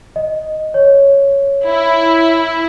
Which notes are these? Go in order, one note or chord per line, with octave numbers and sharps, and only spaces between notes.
D#5
C#5
E4